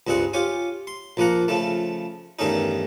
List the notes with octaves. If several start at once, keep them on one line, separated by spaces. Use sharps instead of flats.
C#2 G2 C4 G#4 F#5
F4 G4 C#5 G#5
C6
A#1 F3 A#3 F#5 A#5
C#3 F3 A3
E2 G2 D#3 A3 C#4 D#4